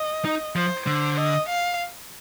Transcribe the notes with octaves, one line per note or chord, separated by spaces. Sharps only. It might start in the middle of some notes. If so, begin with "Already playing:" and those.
Already playing: D#5
D#4
F3 C5
D3 C5
D#5
F5